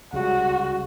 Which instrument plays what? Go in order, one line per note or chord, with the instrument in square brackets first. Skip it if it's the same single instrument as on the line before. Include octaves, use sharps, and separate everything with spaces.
[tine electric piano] C#2 C#3 G3 C#4 [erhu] F#4